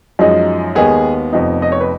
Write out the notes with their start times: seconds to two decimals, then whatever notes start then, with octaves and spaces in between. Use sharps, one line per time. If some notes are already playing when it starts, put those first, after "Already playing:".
0.19 F#2 F3 G#3 D#4
0.75 D#2 D#3 G#3 B3 G#4
1.33 F1 F2 F3 B3 D#4
1.62 D#5
1.72 C#5
1.81 B4